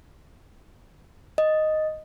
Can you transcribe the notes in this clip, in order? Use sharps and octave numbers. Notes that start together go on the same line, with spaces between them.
D#5